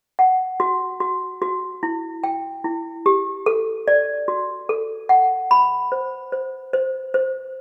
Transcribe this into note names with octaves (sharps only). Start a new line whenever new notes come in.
F#5
F#4
F#4
F#4
E4
G5
E4
G4
A4
D5
F#4
A4
F#5
B5
C5
C5
C5
C5